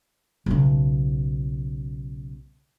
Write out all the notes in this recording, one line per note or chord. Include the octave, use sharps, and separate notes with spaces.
B1 C#3